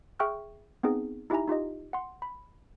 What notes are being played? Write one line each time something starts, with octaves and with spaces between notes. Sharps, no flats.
G#4 E5 G5 C#6 F6 F#6
B3 C4 D#4 G#4
D#4 E4 G4 E5 G#5 A#5
D#4 F4 G4 D#5
F#5 C6
B5